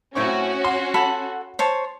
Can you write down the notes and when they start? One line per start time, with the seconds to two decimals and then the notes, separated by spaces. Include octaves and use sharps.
0.15 A2 C4 C#4 F#4 C#6
0.64 C6
0.94 A4 F#5 B5
1.59 C5 C#5 A5